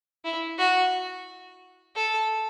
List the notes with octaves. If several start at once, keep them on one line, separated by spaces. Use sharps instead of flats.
E4
F#4
A4